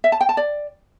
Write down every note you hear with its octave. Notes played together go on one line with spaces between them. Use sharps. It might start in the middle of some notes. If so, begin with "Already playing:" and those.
E5
A5
G5
A5
D5